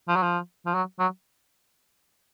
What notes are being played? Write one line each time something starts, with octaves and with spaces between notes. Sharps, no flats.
F3
F#3
F3
F3
F#3
F#3